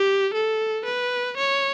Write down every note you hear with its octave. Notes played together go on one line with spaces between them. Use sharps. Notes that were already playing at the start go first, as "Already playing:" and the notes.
Already playing: G4
A4
B4
C#5